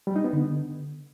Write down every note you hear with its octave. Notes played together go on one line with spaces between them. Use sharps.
G3
D#4
B3
D3